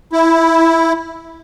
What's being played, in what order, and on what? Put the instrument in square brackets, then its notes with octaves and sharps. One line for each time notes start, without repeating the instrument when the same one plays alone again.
[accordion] E4